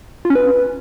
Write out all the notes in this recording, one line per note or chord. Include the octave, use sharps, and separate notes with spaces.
F4
C#4
B4